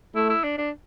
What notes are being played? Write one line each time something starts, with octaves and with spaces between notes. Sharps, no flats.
A3 E4
E4
D4
D4